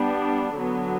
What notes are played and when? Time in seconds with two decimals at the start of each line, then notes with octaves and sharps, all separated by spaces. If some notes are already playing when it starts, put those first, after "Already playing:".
Already playing: G3 B3 D4
0.55 D3 F#3 B3